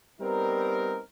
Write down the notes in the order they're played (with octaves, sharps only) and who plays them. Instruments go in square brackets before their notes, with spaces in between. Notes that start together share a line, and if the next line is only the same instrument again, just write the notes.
[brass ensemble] G3 B3 C4 D#4 A#4